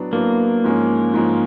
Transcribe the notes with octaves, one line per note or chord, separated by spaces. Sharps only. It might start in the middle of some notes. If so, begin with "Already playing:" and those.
Already playing: A2 F#3 B3 D4
A2 F#3 A#3 B3 D4
G#2 F3 G#3 C#4
G#2 F3 G#3 C#4